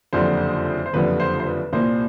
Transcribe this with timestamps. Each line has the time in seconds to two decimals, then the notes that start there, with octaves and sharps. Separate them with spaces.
0.13 F#1 F2 D3 G3 C5
0.86 C5
0.93 F#1 F2 D3 G3 B4
1.20 C5
1.40 C5
1.46 B4
1.73 C2 A#2 G3 A#3 C5